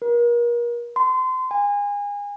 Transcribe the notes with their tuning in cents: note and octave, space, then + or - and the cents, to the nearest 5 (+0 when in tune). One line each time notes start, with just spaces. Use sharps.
A#4 +35
C6 -30
G#5 -30